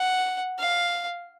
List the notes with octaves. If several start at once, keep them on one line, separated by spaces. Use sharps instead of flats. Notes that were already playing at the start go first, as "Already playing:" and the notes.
Already playing: F#5
F5